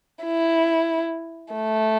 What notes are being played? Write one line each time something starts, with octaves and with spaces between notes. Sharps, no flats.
E4
A3